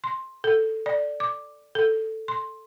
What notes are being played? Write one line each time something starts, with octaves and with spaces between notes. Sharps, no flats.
C6
A4
D5
D6
A4
C6